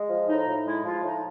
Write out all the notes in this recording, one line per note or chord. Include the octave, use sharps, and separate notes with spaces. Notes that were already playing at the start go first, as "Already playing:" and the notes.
Already playing: G#3
F3
A2 D#4
A2
G#3 E4
F3 F4
A2 D#4